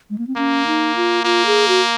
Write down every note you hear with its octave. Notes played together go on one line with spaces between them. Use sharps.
G#3
A#3
C4
A#3 C#4
D#4
F4
A#3 F4
G#4
F#4